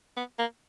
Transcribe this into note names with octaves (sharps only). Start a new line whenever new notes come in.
B3
A#3